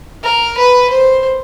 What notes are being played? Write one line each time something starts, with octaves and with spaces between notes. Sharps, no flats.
A#4
B4
C5